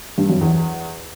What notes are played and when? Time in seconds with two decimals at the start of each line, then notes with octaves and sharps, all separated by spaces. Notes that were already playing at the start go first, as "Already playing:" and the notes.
0.18 G2
0.30 F#2
0.41 E2